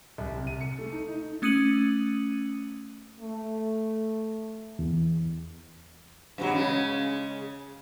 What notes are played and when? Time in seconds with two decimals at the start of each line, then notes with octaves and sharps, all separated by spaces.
0.18 C2
0.35 C3
0.47 D#7
0.61 C#7
0.78 A3
0.92 D#4
1.08 D#4
1.42 A3 C#4 D#6 C#7 D#7 F#7
3.20 A3
4.79 E2
6.38 G2 B2 F#3
6.52 C#3 G#3